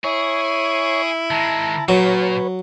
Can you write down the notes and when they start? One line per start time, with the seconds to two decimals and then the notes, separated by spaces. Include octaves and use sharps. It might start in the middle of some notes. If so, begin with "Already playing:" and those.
0.04 E4 G#4 C#5 C#6
1.31 D#3 G#3 A5 A#5
1.89 A#2 F#3 B4 C#5